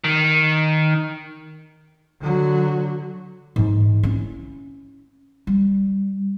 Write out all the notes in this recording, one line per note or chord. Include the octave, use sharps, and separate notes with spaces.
D#3
D3 F#3
G#2 E3
C#4 E4
G3